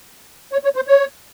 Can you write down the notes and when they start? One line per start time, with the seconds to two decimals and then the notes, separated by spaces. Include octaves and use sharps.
0.52 C#5
0.64 C#5
0.76 C5
0.87 C#5